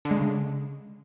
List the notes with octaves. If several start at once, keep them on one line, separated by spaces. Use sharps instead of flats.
D3
G#3
C#3